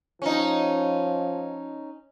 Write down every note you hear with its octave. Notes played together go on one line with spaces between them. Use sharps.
F3 C#4 D#4